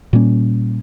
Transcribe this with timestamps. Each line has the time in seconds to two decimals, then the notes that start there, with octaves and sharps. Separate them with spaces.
0.13 A#2 G3 A#3 C#4